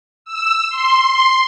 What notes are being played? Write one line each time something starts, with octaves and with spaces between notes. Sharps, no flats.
E6
C6